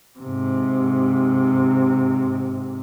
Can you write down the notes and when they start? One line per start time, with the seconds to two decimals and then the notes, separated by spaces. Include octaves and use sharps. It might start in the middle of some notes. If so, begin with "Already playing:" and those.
0.19 G#2 C3